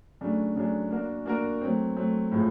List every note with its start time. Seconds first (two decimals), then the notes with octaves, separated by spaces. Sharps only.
0.21 C#3 F#3 A3 D4
0.56 C#3 F#3 A3 D4
0.90 A#3 D4 F#4 A#4
1.26 A#3 D4 F#4 A#4
1.61 F#3 A3 C4
1.96 F#3 A3 C4
2.32 A2 F3 G#3